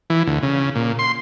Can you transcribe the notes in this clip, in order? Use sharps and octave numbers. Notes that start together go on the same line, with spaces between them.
E3
D2
C#3
A#2
C6